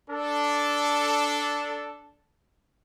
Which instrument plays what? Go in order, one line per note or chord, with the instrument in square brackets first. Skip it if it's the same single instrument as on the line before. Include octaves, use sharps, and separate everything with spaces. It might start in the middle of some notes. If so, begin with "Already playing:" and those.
[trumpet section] D4 A4